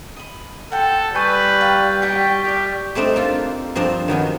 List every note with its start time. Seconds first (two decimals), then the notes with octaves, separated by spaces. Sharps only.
0.17 D#5 B5
0.72 A4 F#5 G5 C6
1.15 G3 B4 G#5 C#6 D#6 G6 A6
1.60 G4 F5 A#5
2.02 D#4 F#4 G4 G5 B6
2.45 G4 A#4 E5
2.95 G3 A3 C4 D4 D#4
3.16 A#3 F4 A4
3.75 G2 F3 C4 D4 A#5
4.08 D#3 F#3 B3 C#4